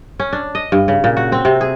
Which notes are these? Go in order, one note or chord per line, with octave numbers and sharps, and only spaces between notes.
C#4
D4
D#5
G2
C#3
A#2
F#4
C4
C3
G#4